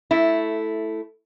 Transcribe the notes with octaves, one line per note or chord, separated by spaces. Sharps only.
A3 E4